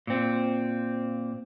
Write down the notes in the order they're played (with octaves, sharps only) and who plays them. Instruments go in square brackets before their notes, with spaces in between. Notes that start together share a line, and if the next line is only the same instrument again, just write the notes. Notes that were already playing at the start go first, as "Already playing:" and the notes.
[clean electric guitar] A#2 C4